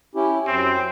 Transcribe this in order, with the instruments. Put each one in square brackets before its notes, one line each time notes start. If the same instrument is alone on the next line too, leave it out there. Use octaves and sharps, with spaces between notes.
[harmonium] C#4 E4 G4
[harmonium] F#2 [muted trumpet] C4